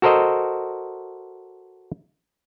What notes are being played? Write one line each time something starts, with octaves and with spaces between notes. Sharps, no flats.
F#4 A4 A#4 C5 D#5